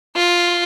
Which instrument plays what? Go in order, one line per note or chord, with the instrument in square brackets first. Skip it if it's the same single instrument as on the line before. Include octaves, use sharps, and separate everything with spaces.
[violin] F4